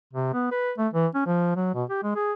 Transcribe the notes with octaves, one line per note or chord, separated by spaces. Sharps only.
C3
B3
B4
A3
E3
C#4
F3
F#3
B2
G4
G#3
G#4